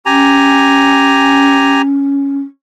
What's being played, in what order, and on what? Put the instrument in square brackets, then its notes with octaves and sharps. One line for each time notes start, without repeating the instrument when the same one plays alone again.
[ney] C#4 [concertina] G4 G#5 A#5